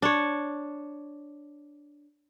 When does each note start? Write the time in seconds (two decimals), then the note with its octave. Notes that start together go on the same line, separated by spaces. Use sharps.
0.02 D4 C#5